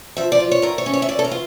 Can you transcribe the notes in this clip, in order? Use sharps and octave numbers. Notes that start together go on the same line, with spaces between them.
F3 E5
D5
F4
C#5
A2 A#4
C#5
C#4
C#5
E5
E3 D5
A4
A#4
F4